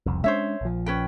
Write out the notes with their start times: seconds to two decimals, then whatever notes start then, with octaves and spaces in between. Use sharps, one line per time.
0.06 E1 C2 F2
0.24 G#3 C#4 D4 C5 C#5 E5
0.61 A#1 F3
0.86 C#4 B4 G5